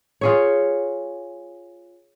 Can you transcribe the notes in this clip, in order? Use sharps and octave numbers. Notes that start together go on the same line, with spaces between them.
F4 G#4 C#5